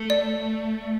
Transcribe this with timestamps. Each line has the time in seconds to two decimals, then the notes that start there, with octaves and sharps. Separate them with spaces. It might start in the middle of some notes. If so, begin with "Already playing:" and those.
Already playing: A3
0.10 D5